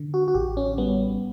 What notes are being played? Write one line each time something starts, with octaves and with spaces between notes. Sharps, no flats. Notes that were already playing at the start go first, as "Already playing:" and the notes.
Already playing: D3
F#4
F#4
A1 G4
C#4
G3 B3